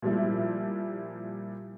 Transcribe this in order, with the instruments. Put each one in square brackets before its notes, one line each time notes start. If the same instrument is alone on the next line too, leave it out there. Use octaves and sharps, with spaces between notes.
[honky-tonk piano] A#2 F3 G3 E4